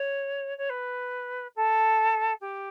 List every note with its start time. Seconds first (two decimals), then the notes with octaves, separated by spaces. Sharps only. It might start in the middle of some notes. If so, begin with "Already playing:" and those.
Already playing: C#5
0.58 C#5
0.69 B4
1.56 A4
2.41 G4